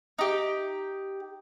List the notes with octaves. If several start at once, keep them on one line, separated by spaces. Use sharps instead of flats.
D#4 G4